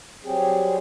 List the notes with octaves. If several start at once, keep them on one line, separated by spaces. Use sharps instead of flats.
F#3 G3 C4 G4 G#4